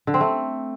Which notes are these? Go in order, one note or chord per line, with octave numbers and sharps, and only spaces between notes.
D3
C4
A3